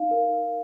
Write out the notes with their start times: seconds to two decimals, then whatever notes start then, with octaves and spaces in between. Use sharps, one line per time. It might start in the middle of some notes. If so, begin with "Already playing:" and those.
Already playing: D#4 F5
0.11 A#4